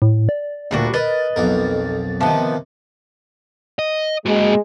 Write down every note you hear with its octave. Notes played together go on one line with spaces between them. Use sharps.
A2
D5
D2 A#2 G3 D4 F#4
A#4 B4 D#5 A6
B1 F2 A#4
C3 D#3 F3 B3
D#5
G#3 A#3 F#4